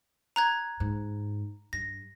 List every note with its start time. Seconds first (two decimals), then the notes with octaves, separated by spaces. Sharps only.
0.36 A#5 F#6 G#6
0.80 G#2
1.73 G2 A#6